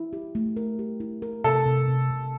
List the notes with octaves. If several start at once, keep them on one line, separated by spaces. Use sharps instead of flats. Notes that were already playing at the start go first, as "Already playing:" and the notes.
Already playing: E4
G4
A3
A#4
G4
E4
A#4
C3 A4
C3
C3
C3